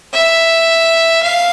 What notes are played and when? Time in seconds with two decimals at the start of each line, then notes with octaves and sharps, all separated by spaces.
0.13 E5
1.22 F5